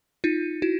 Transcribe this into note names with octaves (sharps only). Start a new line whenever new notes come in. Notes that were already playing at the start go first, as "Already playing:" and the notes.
D#4 F4
E4 F#4